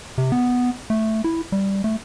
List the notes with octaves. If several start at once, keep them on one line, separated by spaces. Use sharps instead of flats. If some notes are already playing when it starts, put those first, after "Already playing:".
C3
B3
A3
E4
G3
A3